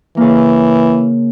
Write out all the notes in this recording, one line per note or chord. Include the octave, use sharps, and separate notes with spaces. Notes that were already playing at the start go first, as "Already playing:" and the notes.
C#3 E3 A#3